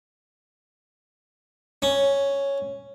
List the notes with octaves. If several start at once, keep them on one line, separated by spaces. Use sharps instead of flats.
C#4